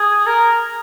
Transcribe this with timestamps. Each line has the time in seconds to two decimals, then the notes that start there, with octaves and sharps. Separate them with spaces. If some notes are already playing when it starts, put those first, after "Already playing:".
Already playing: G#4
0.26 A#4